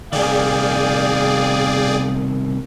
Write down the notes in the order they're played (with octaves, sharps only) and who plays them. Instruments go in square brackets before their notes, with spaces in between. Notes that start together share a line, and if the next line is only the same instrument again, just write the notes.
[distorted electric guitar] C2 D#3 [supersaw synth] G#4 D5 [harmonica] F5 G5 D#6